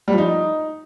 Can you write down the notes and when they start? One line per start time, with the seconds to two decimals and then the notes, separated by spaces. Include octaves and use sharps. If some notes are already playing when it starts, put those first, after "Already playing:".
0.08 G3
0.13 F3
0.18 D#4